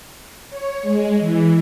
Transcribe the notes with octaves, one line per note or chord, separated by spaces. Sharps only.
C#5
G#3
E3